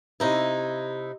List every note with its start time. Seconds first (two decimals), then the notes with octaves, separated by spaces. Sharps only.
0.20 C3 D#4 E4